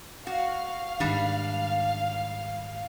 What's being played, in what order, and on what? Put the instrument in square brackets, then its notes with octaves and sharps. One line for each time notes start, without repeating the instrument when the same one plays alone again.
[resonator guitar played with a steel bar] F#4 [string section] F5
[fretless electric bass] G#2 D#3 [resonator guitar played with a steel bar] G3 D4